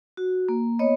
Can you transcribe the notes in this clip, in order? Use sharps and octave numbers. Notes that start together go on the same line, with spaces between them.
F#4
A#3
B3 C#5 D#5